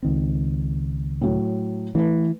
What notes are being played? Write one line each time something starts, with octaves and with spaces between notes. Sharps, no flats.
C#2 D#3 C4
A2 F#3
E3 A3 B4